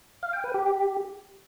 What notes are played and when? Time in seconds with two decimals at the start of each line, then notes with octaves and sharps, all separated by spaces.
0.23 F5
0.33 G5
0.44 B4
0.54 G4